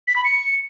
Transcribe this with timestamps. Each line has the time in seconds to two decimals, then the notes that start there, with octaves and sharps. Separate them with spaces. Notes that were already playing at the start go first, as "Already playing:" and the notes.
0.08 B6
0.16 B5
0.25 C#7